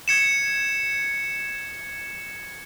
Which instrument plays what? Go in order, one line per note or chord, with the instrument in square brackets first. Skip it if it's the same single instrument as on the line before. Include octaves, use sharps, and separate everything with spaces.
[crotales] G#6 C#7 E7